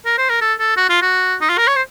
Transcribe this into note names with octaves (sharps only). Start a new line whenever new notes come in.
A#4
C5
A#4
A4
A4
F#4
F4
F#4
D#4
F4
A#4
C#5
C5